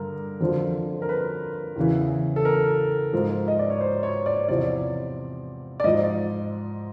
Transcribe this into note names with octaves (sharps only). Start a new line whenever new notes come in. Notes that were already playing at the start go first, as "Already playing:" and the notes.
Already playing: G2 D3 A#4
F2 D3 F3
A#4
B4
E2 C#3 E3
A4
A#4
G#2 F3
D#5
D5
C#5
C5
C#5
D5
E2 C3 F3 D5
D5
G#2 F3 D#5